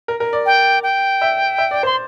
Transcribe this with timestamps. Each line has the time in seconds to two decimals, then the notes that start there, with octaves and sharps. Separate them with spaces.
0.08 A#4
0.20 A#4
0.33 D5
0.46 G5
0.83 G5
1.21 E5
1.58 E5
1.71 D5
1.83 C5 C6